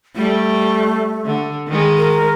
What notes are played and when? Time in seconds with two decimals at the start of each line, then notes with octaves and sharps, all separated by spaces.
0.16 G3 A3
1.25 D3
1.68 D#3 G#3
1.98 A#4